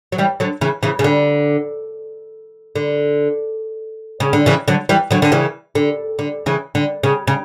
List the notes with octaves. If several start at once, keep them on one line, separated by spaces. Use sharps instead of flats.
F#3
E3 G3
D3 F#3
C#3 E3
C#3 E3
C#3
D3
D3
C#3
D3
C#3 E3
D3 F#3
E3 G3
D3 F#3
D3
C#3 E3
D3
D3
C#3 E3
D3
C#3
C#3